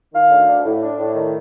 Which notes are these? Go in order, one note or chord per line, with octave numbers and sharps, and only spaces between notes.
D#3 F5
D2
D4
A2
D4
A2
D#3